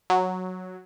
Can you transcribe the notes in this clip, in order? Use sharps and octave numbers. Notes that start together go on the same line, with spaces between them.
F#3